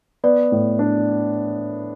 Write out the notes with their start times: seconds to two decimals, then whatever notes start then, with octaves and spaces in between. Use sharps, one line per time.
0.24 B3 D5
0.52 A2
0.79 D4